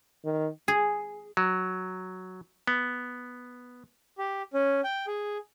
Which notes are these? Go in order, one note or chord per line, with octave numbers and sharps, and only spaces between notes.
D#3
G#4
F#3
B3
G4
C#4
G5
G#4